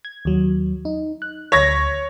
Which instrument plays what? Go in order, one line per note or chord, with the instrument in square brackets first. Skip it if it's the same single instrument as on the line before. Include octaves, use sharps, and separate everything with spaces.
[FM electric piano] G#6
D#2 F#3
D#4
F#6
[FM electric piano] D2 B6 [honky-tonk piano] C#5 G#6 A#6